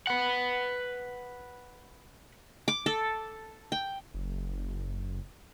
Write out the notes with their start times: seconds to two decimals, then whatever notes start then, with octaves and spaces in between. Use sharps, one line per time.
0.07 B4 F#5
2.68 D6
2.86 A4
3.72 G5
4.14 F#1